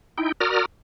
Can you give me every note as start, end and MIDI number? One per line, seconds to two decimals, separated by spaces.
0.18 0.32 63
0.18 0.32 64
0.18 0.32 79
0.41 0.65 66
0.41 0.65 70
0.41 0.65 74
0.41 0.65 82
0.41 0.65 87
0.41 0.65 89